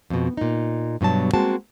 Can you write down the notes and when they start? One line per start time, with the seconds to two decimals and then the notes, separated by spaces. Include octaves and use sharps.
0.10 F2 B2
0.37 A#2 D#4
1.01 G2 B2 F#3 A5
1.34 G#3 A#3 C4 F#4 A5